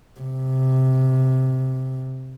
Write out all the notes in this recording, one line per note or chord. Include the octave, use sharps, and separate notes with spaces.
C3